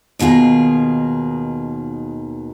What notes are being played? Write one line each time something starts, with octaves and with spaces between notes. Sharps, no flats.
D#2 B2 D#3 F4 G#4